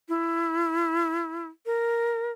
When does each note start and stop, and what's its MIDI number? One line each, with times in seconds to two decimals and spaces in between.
0.09 1.47 64
1.66 2.32 70